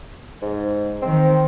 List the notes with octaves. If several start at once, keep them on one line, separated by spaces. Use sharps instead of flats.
G#2
D#3 C4